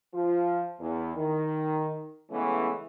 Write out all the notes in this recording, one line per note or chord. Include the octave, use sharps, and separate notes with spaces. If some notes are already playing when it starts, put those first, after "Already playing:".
F3 F4
E2
D#3
C#3 E3 G#3 A3 B3 C#4